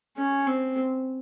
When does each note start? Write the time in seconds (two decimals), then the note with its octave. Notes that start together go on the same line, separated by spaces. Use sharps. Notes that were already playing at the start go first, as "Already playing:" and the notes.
0.17 C#4
0.46 C4